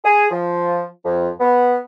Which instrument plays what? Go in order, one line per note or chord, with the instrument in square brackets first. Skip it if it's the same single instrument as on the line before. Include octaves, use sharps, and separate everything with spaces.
[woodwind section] G#4
F3
F2
B3